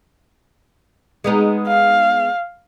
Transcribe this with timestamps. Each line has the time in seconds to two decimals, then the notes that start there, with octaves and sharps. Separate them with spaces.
1.24 G#3 B3 D#4
1.68 F5